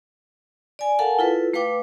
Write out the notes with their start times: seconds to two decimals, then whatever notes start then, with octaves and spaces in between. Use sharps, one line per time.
0.79 D5 G#5
0.99 A4 A#4 F5 F#5 G#5 A5
1.19 E4 F4 A4 B4
1.54 A3 B4 F5 G5 D6